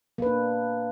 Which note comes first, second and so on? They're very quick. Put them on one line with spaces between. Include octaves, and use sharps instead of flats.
A#3 B4 D4